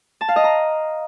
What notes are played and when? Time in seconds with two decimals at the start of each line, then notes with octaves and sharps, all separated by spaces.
0.21 A5
0.28 F5
0.36 D#5
0.44 A#5